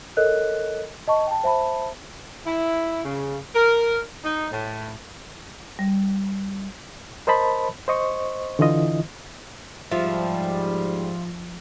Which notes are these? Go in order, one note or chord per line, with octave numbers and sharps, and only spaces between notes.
A4 A#4 C#5 D#5 F#6
D#5 A5 C#6
G5 A5
C5 E5 A5 B5
E4
C#3
A#4
D#4
A2
G3
A#4 C5 D#5 A5 B5
C5 D#5 C#6
D3 E3 E4 F4 D#5
G#2 F3 G3 F4 E5